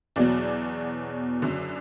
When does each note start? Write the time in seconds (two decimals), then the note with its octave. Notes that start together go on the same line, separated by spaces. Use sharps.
0.16 E2 B2 F#3 D5
1.42 F#1 F#2 D3 F#3